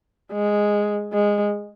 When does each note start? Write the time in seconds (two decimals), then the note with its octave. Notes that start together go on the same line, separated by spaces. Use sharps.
0.32 G#3
1.13 G#3